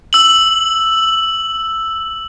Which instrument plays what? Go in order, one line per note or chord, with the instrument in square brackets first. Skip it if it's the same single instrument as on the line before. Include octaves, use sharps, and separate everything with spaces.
[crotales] E6 F#7